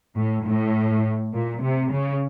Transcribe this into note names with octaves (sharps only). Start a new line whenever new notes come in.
A2
A2
A#2
C3
C#3